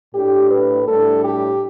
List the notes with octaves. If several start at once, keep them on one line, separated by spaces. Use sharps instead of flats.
A2 A3 D4 G4
B4
A2 G3 D4 A4
G4